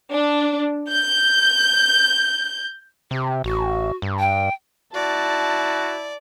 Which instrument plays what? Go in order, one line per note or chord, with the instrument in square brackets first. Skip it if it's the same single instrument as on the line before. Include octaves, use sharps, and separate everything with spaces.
[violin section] D4
G6
[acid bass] C3 [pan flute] G4
[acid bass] A1 [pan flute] F#4
[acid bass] G2
[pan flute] G5
[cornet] E4 [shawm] F#4 [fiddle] D5 [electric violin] A5